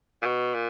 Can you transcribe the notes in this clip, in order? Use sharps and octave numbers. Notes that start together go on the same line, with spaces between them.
A#2
B2
A#2